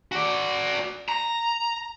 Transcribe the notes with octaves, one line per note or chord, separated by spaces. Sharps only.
F#4 D5
A#5